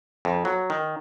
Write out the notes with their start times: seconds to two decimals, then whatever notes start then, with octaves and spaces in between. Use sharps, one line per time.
0.25 F2
0.45 F#3
0.70 D#3